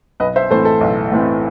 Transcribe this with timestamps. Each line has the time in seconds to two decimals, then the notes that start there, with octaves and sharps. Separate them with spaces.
0.20 B1 B4 D#5
0.36 C5 E5
0.50 A2 E3 A3 C4 A4 C5
0.65 A4
0.81 B1
1.11 A2 E3 A3 C4